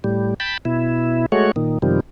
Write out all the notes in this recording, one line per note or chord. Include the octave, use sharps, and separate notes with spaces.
A2 G3
G5 A5 B5
B2 E4
G#3 A3 F#4 C#5
A#2 D#3
F#2 C3 D#3 F3 G3